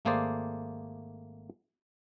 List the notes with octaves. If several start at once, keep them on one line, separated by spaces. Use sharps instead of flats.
G#1 A3 A#3 G#4 C5 D5